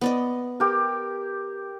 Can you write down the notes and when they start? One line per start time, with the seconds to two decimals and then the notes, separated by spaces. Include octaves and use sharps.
0.01 B3 D5 D#5
0.60 G4 A#4